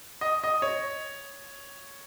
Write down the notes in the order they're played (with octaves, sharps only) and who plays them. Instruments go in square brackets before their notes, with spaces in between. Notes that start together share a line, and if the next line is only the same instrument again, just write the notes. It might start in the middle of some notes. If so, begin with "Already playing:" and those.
[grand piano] D#5
D#5
C#5